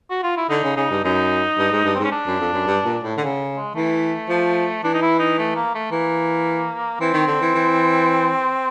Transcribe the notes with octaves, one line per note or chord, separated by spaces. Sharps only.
F#4
F4
E4
D3 D#4
C#3
C#3 D#4
G2
F#2 D#4
G2
G#2
G2
G#2 C4
C#4
D4
F#2
F2
F#2
G2
A#2
A2
D3
C#3
G#3
E3 A3
F3
E3 D4
D#4
E4
D#4
A3
A#3
A3
E3 A#3
E3 C4
D#3
D3
E3
E3